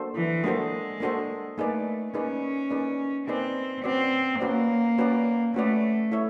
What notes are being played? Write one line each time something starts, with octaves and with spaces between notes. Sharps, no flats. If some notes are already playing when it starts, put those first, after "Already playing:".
Already playing: A#3 D4 F#4 A4 C5
E3
G#3 A#3 D4 F#4 A4 C5
A#3 D4 F#4 A4 C5
A3 A#3 D#4 G#4 B4 D5
A#3 C#4 D#4 G#4 B4 D5
A#3 D#4 G#4 B4 D5
A#3 C4 D#4 G#4 B4 D5
C4 C#4 F#4 B4 D5
A#3 C#4 F#4 B4 D5
C#4 F#4 B4 D5
A3 C#4 F#4 B4 D5
E4 A4 C#5 E5